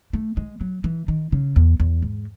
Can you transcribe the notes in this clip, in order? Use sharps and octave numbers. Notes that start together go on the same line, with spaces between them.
A3
G#3
F#3
E3
D#3
C#3
E2
E2
G#2